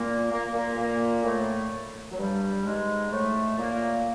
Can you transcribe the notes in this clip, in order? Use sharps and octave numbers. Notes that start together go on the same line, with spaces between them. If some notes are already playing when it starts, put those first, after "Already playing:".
Already playing: A#2 A#3
A#3
A#2 A#3
A#2 A#3
A2 A3
F#3
G2 G3
G#2 G#3
A2 A3
A#2 A#3